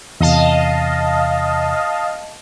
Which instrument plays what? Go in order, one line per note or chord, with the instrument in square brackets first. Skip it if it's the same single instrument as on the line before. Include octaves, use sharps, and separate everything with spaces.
[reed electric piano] E2 C3 [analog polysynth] D#5 F5 A5